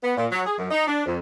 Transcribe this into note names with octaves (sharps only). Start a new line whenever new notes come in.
B3
A#2
F#3
G#4
F#2
D#4
D4
F2